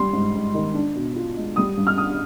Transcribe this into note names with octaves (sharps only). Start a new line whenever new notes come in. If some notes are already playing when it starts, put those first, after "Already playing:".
Already playing: G3 C6
G#2
G#2
D#3
D4
B2
F4
G#3
G3 D#6
G2
F6
D4 D#6